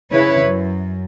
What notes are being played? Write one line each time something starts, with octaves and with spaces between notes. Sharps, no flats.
C#3 E4 B4 C#5
F#2